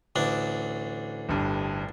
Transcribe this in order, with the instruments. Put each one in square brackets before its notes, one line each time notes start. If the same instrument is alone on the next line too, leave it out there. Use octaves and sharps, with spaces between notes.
[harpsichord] A1 D2 D4
[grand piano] G1 G2